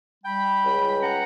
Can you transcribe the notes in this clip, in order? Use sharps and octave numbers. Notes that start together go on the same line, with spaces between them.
G3 G5 B5
C#2
C#4 F#5 A#5